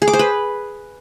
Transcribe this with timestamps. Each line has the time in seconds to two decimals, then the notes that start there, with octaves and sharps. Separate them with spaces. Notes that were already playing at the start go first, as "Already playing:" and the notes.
0.02 G#4
0.08 D6
0.13 C5
0.19 B4